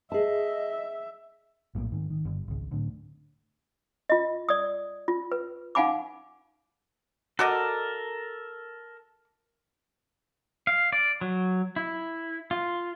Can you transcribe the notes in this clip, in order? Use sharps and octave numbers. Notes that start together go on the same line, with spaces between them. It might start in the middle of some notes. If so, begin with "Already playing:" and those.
G#4 D#5 E5 A5
A#1 A2 F3 A#3
G#2 D#3
D#3
G1
G#1 C#2
A2 D3
F4 D#5
D5 D#6
F4
B4
D#4 F5 F#5 G#5 B5 D6
F#4 A4 A#4 D5 D#5
F5
D5
F#3
E4
F4